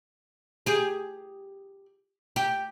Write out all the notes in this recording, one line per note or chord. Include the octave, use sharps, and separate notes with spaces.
G4 G#4
G4